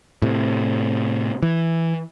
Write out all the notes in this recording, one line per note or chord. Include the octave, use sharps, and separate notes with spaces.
A2 C3
E3